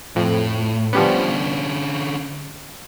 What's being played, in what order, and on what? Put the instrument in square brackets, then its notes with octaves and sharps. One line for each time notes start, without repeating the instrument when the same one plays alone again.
[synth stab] F2 [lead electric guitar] A2
[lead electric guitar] D3 C#4 [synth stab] F3 G3 B3